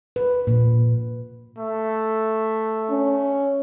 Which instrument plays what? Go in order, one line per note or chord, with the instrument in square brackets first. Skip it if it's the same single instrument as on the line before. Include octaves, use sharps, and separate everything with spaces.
[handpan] B4
A#2
[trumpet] A3
[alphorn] C#4